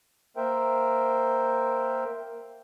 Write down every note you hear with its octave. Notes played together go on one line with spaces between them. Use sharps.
A#3 A#4 C5 E5 G5